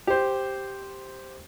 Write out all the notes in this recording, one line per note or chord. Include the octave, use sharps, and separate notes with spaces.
G4 C5